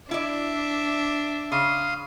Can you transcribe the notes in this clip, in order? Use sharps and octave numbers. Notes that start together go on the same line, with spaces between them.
D4 E4 D5 E5
C#3 F5 C6 D#6